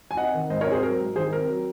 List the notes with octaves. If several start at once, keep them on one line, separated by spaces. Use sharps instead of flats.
G#5
C4 D#5 F#5
D#3
G#2 C5 D#5
A#4 C#5
C4
G#4 C5
F#3 A#4
G#2
D#3 G#4 C5
C4 A#4
F#3